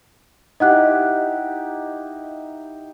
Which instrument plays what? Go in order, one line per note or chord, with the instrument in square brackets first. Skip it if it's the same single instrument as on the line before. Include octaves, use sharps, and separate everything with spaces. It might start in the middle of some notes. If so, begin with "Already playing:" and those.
[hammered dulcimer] D#4 E4 G4 [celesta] D#5 F#5 F#6